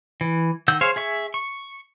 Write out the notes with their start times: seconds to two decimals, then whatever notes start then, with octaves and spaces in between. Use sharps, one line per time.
0.21 E3
0.68 D#3 F#5 E6 G6
0.81 G#4 C5 C#5 F5 G#5
0.96 G#4 E5 C#6
1.34 C#6